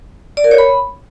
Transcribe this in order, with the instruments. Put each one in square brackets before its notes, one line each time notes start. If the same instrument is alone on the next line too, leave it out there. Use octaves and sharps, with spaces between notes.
[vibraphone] D5
A#4
C#5
B5